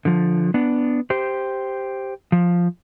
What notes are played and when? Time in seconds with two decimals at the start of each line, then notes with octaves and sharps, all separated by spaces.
0.05 D3 F3
0.54 B3 D4
1.10 G4 C5
2.32 F3